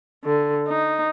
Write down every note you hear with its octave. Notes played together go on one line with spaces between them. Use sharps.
D3
D#4